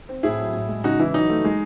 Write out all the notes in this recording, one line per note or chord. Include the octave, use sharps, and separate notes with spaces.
C4
A2 E4 G#4
F#3
A2
G#3
C#3 D#4 F#4
E3 E4
F#3 D#4
A3
G#3